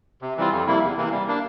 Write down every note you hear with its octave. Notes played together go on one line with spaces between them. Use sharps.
C3
E3 G3 C4 F4
F2
C3 G3 A#3 E4
E2
C3 E3 A#3
G3
A#3 D4